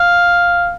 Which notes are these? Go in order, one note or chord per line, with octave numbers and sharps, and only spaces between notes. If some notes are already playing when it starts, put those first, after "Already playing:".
Already playing: F5